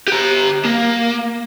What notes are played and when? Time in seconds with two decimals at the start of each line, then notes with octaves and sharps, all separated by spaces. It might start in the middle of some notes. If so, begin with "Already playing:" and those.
0.08 G4 A#5
0.65 A#3